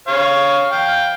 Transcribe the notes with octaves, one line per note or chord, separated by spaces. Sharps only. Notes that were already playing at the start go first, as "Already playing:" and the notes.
C#5 F5
F5 G5